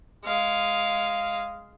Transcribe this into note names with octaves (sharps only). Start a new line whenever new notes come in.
G#3 F5